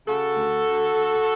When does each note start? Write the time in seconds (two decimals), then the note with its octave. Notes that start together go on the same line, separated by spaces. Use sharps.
0.08 C#3 F#4 A4
0.37 D2
0.65 D2
0.94 D2